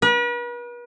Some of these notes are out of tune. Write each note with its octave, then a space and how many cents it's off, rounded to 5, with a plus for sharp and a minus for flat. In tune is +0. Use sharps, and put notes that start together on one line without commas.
B4 -40